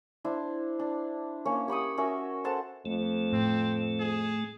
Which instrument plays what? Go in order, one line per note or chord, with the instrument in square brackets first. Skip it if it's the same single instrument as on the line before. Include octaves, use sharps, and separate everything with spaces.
[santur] D4 E4 C5
D4
A#3 C#4 C#5
G4 B5 C#6 D#6
C#4 F#4 A#4 E5
A4 C5 F#5 A5
[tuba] F2 [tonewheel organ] A3
[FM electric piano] A2 [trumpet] C4
[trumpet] G#4